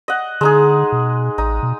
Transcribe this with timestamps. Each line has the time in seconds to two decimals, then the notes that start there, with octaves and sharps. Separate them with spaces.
0.08 D#5 F#5
0.41 D3 G#3 D#4 G#4
0.92 B2
1.38 A1 D#4
1.63 B2